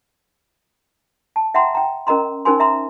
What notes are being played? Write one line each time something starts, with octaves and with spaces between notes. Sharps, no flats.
A5
E5 F#5 G5 A#5 C6
G5 A#5
C#4 A#4 D#5 A#5 C6
C#4 D#4 A#4 C5 G#5 C6
E5 A#5 C6